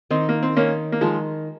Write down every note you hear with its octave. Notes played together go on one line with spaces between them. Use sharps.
D#3 C4 D#4
A#3
C4
D#3 A#3 C#4
A#3
D#3 F3 G#3